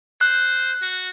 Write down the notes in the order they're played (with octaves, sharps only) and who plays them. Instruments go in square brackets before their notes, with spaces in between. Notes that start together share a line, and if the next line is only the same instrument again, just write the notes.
[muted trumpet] C5 [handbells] F#6
[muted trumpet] F#4